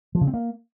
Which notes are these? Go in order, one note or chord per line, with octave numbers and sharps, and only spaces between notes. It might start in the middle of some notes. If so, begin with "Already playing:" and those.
F3
C#3
C4
A#3